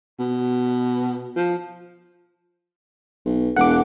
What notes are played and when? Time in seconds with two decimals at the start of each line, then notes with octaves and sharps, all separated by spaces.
0.20 B2
1.36 F3
3.25 B1
3.56 E1 F#5 D6